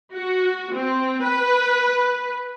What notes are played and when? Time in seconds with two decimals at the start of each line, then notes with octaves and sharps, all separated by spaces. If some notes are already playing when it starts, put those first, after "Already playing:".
0.13 F#4
0.73 C4
1.25 B4